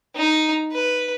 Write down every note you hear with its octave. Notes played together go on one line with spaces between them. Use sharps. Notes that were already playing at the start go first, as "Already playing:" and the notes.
D#4
B4